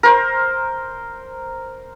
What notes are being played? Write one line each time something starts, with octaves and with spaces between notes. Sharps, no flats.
A#4 C5